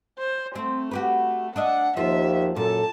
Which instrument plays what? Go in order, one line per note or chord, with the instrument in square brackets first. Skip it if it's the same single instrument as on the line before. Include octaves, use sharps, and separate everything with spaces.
[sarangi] C5
[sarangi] A3 [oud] C4
[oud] F#4 G4 B4
[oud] D4 D#5 E5 [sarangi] F#5
[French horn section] D#2 F3 [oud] F4 [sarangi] E5
[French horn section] F#2 A4 [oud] A#2 [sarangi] A5